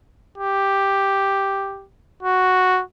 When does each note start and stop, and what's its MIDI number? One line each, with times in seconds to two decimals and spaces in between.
0.38 1.86 67
2.23 2.81 66